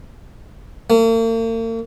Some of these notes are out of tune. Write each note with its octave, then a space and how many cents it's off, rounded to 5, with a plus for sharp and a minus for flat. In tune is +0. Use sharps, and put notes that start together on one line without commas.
A#3 -45